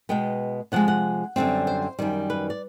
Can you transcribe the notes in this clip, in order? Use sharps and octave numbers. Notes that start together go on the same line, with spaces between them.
B2 G#3 B3 G5
C3 F3 G#3 F#5
F#5
F#2 D3 G3 C4
C5
F#2 D#3 G3
B4
D5